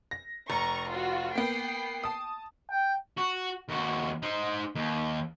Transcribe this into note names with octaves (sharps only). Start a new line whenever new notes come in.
A#6
F1 A#5 C#6
F4 F#4
A#3 B3 G5 C7
A5 D#6
G5
F#4
D#2 F#4
D#4 C5
D#2